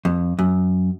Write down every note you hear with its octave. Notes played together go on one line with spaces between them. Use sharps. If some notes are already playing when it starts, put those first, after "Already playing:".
F2
F#2